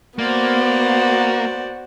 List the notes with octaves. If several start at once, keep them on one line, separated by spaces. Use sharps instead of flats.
A#3 B3 F#4 C5 D5